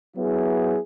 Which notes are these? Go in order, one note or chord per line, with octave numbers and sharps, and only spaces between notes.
F#3 B3 E4 G#4